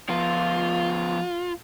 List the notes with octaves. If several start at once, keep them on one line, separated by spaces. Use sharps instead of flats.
F3 B3 F4